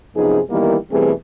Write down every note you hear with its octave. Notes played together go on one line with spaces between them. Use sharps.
F#2 C3 F3 B3 D#4 G#4
D#3 E3 G3 A#3 B3 E4
B2 E3 G3 A3 C4 G#4